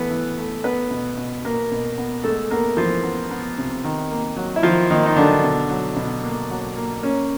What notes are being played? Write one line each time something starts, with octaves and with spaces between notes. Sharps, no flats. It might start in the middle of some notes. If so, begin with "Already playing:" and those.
Already playing: E3 A3 B3 B4
E3
A3
B3 B4
B2
B2
B2 A#3 A#4
B2
B3
G#3 A3 A4
A#3 B3 A#4
E3 F3 F4
B3
B3
C3
D#3
A#3
F#3
E4
D#3 F3 F4
D#3 A#3 D#4
D#4
D3 F#3 D4
B2
F#3
B2
A#3
F#3
A#3
A#3 C#4